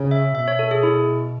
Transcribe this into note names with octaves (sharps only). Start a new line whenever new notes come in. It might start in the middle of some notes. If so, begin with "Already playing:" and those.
Already playing: C#3
E5
B2 E5
C#5
A4
G#4
E4